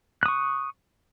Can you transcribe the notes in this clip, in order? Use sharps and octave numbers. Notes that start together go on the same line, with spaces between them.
C#6 D#6 F#6